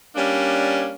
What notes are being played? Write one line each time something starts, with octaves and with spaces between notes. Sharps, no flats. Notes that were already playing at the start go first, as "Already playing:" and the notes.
G3 A#3 C#4 D4